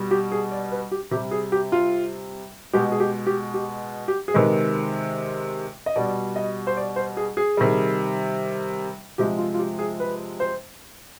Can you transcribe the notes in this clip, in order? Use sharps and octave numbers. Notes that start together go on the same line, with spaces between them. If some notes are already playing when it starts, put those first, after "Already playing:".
Already playing: B2 G3
G4
G#4
D5
B4
G4
C3 G4
G3
G#4
G4
F4
B2 G#3 G4
G#4
G4
G4
G4
G4
G#4
C3 D#3 G#3 B4
D#5
B2 G3 D5
D#5
C5
D5
C5
G#4
G#4
C3 D#3 G3
C3 F3 G#3 G4
F4
F4
G4
G#4
B4
C5